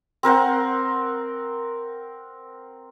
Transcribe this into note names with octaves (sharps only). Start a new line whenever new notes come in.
C4 A#4 C5 F#5